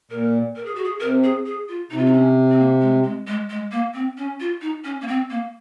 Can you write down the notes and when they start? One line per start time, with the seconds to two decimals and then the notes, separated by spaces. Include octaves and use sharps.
0.11 A#2 A#4
0.56 A#4
0.65 G#4
0.75 F#4
0.84 G#4
1.00 C3 A#4
1.24 G#4
1.46 G#4
1.68 F4
1.91 C3 D#4
1.98 F4
2.06 D#4
2.13 C#4
2.51 C4
2.59 A#3
2.81 G#3
3.03 G#3
3.27 G#3
3.50 G#3
3.72 A#3
3.94 C4
4.17 C#4
4.40 F4
4.61 D#4
4.84 C#4
5.01 A#3
5.08 C4
5.30 A#3